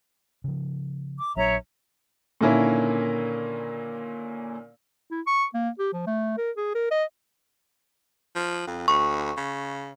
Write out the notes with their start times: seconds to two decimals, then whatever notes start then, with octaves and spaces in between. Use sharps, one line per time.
0.44 C#3 F3
1.19 D6
1.36 A#1 F#3 D4 C#5 E5 A#5
2.41 A#2 D3 D#3 A#3 C#4 E4
5.11 E4
5.27 C#6
5.54 A#3
5.79 G4
5.93 F3
6.07 A3
6.38 A#4
6.57 G#4
6.75 A#4
6.91 D#5
8.35 F3
8.67 F2
8.88 D2 C#6
9.37 C#3